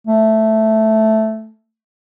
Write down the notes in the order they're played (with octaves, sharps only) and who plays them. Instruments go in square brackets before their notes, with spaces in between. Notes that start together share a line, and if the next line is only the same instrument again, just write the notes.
[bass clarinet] A3